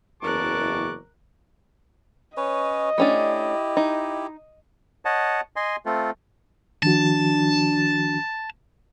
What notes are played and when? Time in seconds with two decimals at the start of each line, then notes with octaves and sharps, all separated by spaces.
0.22 F#1 E2 A#4 A5 C#6 D6 F#6
2.37 C#4 B4 C#5 D#5
2.98 A3 C#4 D4 E4 G4
3.77 D#4
5.05 C#5 D#5 F#5 A5
5.56 D#5 G#5 C6
5.86 A3 C4 F4 A4
6.83 D#3 F3 D4 F#4 A5